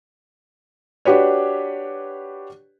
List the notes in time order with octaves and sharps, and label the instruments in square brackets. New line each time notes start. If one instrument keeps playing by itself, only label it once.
[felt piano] D4 F#4 G4 B4 C#5